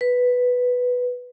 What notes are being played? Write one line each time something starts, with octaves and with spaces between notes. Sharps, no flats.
B4